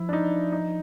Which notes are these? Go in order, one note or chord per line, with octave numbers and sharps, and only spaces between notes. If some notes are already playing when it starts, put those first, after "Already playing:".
Already playing: F3 E4
D4
D#4
D#4